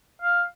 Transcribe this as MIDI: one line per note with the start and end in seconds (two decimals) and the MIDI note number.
0.22 0.44 77